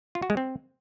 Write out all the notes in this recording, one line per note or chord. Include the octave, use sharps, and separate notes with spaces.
F4
F#4
G#3
C4